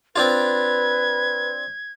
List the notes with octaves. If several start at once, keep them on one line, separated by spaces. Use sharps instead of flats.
C4 D4 F4 B4 G#6